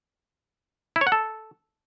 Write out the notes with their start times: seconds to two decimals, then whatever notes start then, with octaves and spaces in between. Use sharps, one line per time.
0.96 E4
1.01 C#5
1.07 F#5
1.12 A4